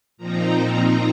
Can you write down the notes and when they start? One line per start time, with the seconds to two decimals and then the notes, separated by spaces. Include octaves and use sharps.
0.17 A#2 F3 C4 D#4 A#5